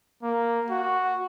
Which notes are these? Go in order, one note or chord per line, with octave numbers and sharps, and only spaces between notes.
A#3
F#4